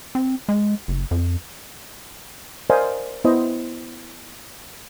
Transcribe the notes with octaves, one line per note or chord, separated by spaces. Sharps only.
C4
G#3
F#1
F2
A#4 C5 D5 D#5 F5 G#5
B3 E4 C5 D#5